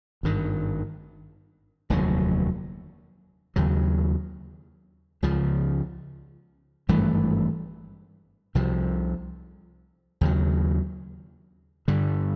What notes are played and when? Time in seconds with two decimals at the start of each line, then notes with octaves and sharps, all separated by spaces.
0.23 G#1 G2 D#3
1.90 F1 D#2 D3 F#3
3.56 D#2 C#3 F#3
5.23 C#2 C#3 F3
6.89 G#1 G2 E3 A3
8.55 C2 C3 F3
10.21 D#2 C#3 F#3
11.88 G2 D3 G3